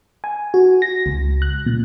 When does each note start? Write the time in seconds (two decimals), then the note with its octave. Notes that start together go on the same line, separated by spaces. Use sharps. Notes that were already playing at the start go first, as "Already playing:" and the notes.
0.24 G#5
0.54 F#4
0.82 A#6
1.06 C#2
1.42 F#6
1.66 A#2